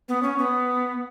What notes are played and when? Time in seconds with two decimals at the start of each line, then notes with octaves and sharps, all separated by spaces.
0.09 B3
0.23 C#4
0.38 B3